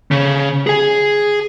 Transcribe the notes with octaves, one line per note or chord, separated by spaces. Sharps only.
C#3
G#4 G#5